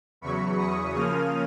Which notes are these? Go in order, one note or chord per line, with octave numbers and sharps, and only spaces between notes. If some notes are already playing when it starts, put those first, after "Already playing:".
E2 C#3 F#3 B5 C#6
C#6 D#6
C#3 F3 A#3 C#4 D#6 F6